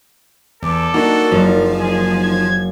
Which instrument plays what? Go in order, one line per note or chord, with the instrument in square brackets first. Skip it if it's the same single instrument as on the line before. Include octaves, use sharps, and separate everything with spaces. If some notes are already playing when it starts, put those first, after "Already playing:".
[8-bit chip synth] E2 [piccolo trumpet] A4 [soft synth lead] D6
[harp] A#3 [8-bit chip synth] D4 F#4 [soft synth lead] D#4
[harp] F#1 F#3 [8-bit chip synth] F3
[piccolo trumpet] G#4
G#6